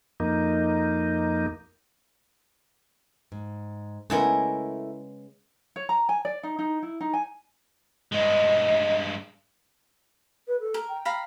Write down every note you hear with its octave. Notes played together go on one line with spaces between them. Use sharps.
F2 A#3 D#4
G#2
C#3 G#3 A3 B3 E4 A#4
C#5
A#5
G#5
D5
D#4
D#4
E4
D#4
G#5
G2 G#3 D#5
B4
A4
A#4
G5
F5 A#5 B5